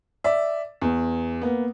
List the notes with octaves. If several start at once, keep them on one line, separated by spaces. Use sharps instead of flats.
D5 E5
E2
A#3 B3